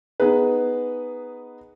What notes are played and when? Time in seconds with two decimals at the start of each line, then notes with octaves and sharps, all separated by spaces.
0.20 B3 D#4 G#4 B4